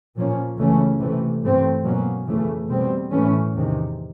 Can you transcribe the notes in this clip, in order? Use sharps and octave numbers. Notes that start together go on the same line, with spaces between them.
A#2 F3 A#3 C#4
C#2 C#3 E3 A3 C#4
C3 E3 A3
G2 E3 A3 C4
B2 F#3 A#3 C#4
F2 C#3 E3 A3
B2 G3 C4
A2 E3 A3 C#4
E2 C3 D#3